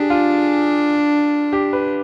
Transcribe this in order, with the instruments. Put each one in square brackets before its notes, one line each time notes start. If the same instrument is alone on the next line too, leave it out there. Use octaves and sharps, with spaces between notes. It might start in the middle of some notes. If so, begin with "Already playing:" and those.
Already playing: [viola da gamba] D4 [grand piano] G4 G#4
[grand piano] F4
G4
B4